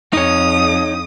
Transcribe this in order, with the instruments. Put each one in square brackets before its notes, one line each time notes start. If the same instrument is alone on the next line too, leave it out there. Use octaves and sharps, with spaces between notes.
[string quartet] F2 D#6 [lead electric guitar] D#4 C#5